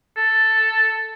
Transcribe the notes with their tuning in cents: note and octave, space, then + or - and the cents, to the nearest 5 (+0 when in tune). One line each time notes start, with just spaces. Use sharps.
A4 +5